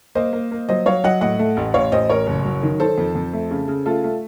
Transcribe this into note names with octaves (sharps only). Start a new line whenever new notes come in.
A#3 C5 D#5
A#3
A#3
F#3 C5 D#5
F#3 C#5 F5
F#3 D#5 F#5
A2 D#5 F#5
A3
A1
A1 C#5 F5
A1 C5 D#5
A1 A#4 C#5
F#1
F#3
D#3
D#3 A4 C5
F2
F2
A3
C#3
C#3
A3 F4 A4
A3